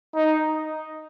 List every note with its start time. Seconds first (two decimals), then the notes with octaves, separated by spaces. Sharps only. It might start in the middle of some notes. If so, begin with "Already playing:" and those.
0.15 D#4